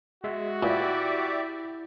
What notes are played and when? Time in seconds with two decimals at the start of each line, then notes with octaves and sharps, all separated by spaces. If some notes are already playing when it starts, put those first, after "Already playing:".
0.24 G#3 F#4 E5
0.63 A#2 E4 G4 D5 E5